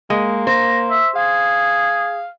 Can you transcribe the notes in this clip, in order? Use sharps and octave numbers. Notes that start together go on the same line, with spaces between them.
G#3 A#3
C5 A#5
E5
G#4 F5